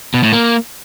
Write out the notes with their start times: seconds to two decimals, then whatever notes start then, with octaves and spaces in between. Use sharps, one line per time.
0.14 B2
0.23 A2
0.32 A#3